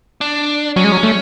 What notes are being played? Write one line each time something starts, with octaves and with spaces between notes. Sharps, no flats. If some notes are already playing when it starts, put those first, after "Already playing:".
D4
F#3 C#4
G#3
F#3
A3